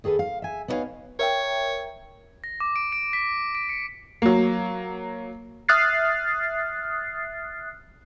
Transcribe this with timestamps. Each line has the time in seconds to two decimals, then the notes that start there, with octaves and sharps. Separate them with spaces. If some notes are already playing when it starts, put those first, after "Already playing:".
0.04 D#2 G#4 A4 B4
0.19 F5
0.42 E5 G#5
0.68 B3 D#4 B4 C#5 F5 G#5
1.19 A#4 C#5 E5 G5
2.44 A#6
2.60 D6
2.76 D7
2.92 D7
3.13 B6
3.55 D7
3.69 C#7
4.22 F#3 A#3
5.69 E5 D#6 F6 F#6 A6 C7